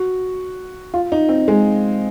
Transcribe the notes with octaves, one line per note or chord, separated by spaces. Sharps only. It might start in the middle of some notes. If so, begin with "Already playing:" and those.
Already playing: F#4
F4
D#4
C4
G#3